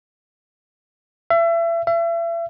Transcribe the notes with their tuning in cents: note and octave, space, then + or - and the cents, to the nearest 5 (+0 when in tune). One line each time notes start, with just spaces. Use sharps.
E5 +30
E5 +35